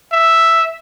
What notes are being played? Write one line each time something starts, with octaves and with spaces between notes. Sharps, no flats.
E5